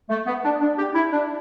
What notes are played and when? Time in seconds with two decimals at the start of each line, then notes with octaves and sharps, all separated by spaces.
0.09 A3
0.27 B3
0.44 D4
0.61 D4
0.78 G4
0.95 E4
1.12 D4